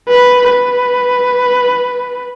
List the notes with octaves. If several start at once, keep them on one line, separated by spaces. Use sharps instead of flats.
B4
B4